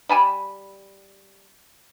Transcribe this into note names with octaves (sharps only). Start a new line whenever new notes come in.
G3 G#5 A5 B5